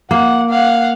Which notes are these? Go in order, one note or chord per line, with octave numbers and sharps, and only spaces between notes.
A#3 F#5
F5 F#5